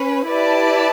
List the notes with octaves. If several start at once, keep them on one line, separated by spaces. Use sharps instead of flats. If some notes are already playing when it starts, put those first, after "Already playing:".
Already playing: C#4 B4
E4 G4 B4 D5 A5